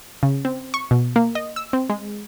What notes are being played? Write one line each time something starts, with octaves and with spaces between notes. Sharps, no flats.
C#3
C4
C#6
B2
A#3
D#5
E6
C4
G#3